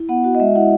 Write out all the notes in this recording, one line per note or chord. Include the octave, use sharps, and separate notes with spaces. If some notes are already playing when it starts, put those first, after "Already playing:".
Already playing: E4
B3 F#5
F#4
D#5
G#3 E5
E4 F#5